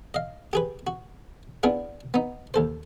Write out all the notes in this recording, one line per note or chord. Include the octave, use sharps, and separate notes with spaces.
D#5 F5
G4 G#4 B4
F#4
B3 D4 E4 F4 G#4
B3 D#4
D#2 A4 C5